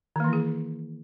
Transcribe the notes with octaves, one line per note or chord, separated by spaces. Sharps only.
D#3 E3 A#3 E4 G#4